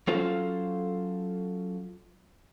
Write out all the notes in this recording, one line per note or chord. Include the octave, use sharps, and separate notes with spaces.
F#3 C#4 F4 A4 C5 F5